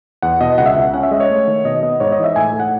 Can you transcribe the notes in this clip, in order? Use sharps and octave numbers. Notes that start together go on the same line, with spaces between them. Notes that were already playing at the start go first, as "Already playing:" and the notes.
E2 F#5
B2 D#5
C#2 F#5
E5
C#2 F#5
C#4 F#5
E5
G#3 D#5
C#5
A3
D#3
B2 D#5
B3 D#5
G#2 C#5
D#5
E3
E5
A2 G#5
A2
F#5